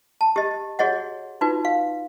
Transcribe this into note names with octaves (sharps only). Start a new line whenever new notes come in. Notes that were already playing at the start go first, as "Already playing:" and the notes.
A5
G4 D#5
F#4 G#4 C#5 D#5 F#5
D#4 F4 F#4 B4
F5